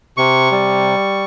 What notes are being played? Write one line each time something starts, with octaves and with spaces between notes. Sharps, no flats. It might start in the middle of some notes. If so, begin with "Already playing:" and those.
C3 C#6
G3